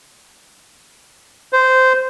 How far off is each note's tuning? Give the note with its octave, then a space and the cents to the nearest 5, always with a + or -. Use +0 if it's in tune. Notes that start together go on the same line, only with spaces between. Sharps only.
C5 -15